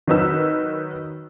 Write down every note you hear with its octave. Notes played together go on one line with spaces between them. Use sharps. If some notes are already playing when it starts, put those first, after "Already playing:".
D#3 F#3 D#4 B4 E6